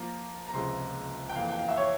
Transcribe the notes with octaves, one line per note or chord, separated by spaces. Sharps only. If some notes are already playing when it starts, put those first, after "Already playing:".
Already playing: F3 A#3 F4 A#5
A#5
C#2 C3 F3 G#3 C6
G5
F2 E3 A#3 F5
G5
F5
E5
C#5